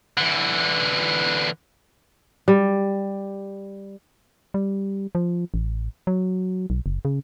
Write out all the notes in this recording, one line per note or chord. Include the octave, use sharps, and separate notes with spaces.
D3 E3
G3
G3
F3
A1
F#3
B1
F#1
C#3